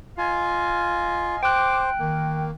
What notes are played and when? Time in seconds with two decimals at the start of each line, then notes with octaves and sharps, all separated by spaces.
0.18 F4 D#5 F5 G#5
1.43 C5 G5 D6 F#6
1.99 D#3 A#3